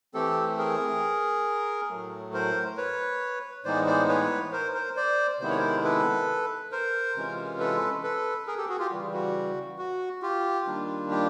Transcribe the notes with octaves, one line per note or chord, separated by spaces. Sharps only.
E3 A3 C4 G4 A4
G#4 A#4
A2 F#3 A3
A#4 C5
B4 C#5
A2 E3 G#3 B3 D#4 C5 D5
C5 D5
B4 C#5
A#4 C5
A#4 C5
C5 D5
C3 D#3 G#3 B3 E4 C5
C#5
A#4 C5
A4 B4
A#4 C5
C3 E3 G#3 C#4 F4
A4 B4
A4 B4
G#4 A#4
G4 A4
F#4 G#4
F4 G4
C#3 E3 G3
F#4
F#4
F4 G4
D#3 G3 A#3 D4 F4
F4 G4